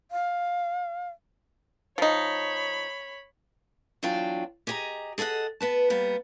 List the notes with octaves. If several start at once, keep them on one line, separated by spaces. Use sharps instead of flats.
F5
F3 D#4 C#5 B5
E2 F#3 D4 F4 G5
G4 G#4 D#5 G5 A#5
G#4 A4 D#5 F5 F#5
B3 B4 A5
G3 A#3 B3